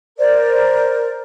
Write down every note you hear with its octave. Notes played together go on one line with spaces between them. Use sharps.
A#4 C5 D5